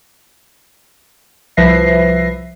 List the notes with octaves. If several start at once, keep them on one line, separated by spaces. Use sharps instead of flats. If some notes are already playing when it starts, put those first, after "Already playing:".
C2 F3 B4 E5 A#6 C7